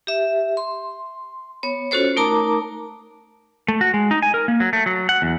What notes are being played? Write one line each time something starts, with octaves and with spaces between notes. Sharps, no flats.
G4 E5
C6
B3 C#5
C#4 F4 F#4 A4 C5 C#5
A3 D#4 A#4 A5 A#5 D6
A3
F#4
G#3
D#4
G#5
A#4
A#3
F#3
A3
F#3
F#5
E2